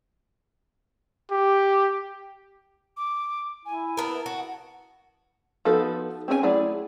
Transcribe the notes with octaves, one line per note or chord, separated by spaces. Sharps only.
G4
D6
E4 G#5
B3 A#4 A5
F#4
F3 B3 D#4 F#4 A4
C4 C#4 G#4 A#4 G#5
F#3 A3 E4 G#4 D5